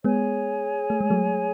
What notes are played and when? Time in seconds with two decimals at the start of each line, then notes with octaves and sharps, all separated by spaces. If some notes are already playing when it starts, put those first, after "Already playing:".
0.04 G#3 B3 G#4 C#5 G#5
0.90 A3
1.01 G#3
1.10 F#3 A3